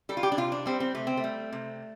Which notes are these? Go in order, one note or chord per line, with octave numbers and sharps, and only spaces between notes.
G3 A4
F4
G4
D4
C3 F4
D4
G3 C4
C4
C3 A3
C4
A3
G3
C3